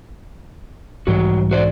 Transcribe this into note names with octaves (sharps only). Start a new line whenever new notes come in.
B1 G#2 E3 G3 F#4
F#4 C5 D5